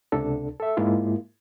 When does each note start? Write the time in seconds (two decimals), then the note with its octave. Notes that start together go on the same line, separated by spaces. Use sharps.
0.12 C#2 C3 D4 A4
0.60 A4 E5
0.77 G#2 G#3 A#3 E4 F4